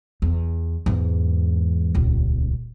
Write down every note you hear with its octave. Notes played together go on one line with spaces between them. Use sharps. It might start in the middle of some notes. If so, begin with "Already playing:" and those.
E2
E2 G#2
D#1 C#2